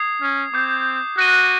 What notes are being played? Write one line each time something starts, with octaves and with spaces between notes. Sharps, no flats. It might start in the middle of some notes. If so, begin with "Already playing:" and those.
Already playing: D#6 G#6 C7
C#4
C4 D6 G6 C7
F#4 F#6 A#6 D#7 G7